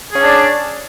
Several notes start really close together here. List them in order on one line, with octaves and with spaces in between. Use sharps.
G#4 C#4 D4 D5